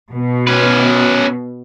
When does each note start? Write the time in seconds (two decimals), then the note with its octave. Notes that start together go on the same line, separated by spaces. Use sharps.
0.13 B2
0.47 C#4 B4